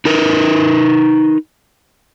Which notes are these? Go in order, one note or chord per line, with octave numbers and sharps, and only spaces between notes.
D#4 A#4 B4